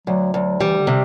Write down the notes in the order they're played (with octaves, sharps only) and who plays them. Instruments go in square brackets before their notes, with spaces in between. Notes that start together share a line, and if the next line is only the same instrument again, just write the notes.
[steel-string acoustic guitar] D2 [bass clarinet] F#3
[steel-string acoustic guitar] D2 [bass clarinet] F#3
[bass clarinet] E3 [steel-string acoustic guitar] G3
[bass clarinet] D3
[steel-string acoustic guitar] C3